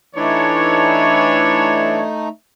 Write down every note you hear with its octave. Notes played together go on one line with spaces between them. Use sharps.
E3 A3 D4 D#4 C#5